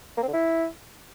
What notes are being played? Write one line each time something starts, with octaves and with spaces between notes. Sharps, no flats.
A#3
C4
D3
E4